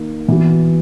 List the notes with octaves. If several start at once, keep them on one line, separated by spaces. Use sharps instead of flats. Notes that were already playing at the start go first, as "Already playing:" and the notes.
Already playing: D#3 A#3 D#4
E3 B3 F#4